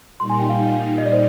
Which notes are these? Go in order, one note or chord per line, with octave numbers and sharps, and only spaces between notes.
A#2 G3 A#3 D#4 C6
G#5
G5
F5
D#5
D5
C5